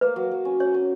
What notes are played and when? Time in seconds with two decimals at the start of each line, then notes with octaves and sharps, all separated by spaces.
0.01 A#3 B4
0.16 F#3
0.31 F#3
0.45 C#4
0.60 C#4 C#5
0.74 C#4